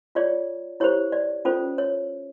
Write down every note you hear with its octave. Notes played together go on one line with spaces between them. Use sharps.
F4 G#4 C#5 D5
E4 G4 C5 C#5
D5
C#4 F4 A4 C5
C#5